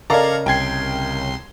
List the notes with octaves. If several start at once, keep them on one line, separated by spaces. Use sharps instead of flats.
C#3 A4 A#4 D5 D#5 F5 A#5 G#6
C2 G5 C6 G#6 C7